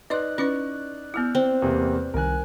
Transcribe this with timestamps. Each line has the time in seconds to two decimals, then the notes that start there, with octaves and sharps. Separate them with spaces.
0.10 D#4 B4 D5 D#5 C6 F#6
0.38 C#4 E4 B4 C#6
1.14 B3 E4 E6 F6 G6
1.35 C4
1.62 E2 C3 A#3
2.14 C2 D#3 A#4 G#5 F#6